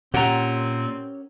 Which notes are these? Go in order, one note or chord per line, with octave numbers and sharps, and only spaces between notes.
A#2 C4 C#4 G4 A#4 F#5 A#5